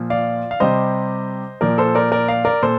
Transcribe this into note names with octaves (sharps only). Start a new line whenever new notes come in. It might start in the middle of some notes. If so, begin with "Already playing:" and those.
Already playing: A#2 F3
D5 F5
F5
C3 G3 C5 D#5
A#2 F3 A#4 D5
A4 C5
A#4 D5
A#4 D5
D5 F5
A#4 D5
A#2 A4 C5